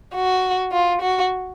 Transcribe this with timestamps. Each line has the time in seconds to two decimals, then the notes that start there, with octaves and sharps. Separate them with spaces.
0.15 F#4
0.72 F4
1.02 F#4